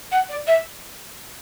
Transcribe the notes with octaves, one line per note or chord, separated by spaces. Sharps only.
F#5
D5
E5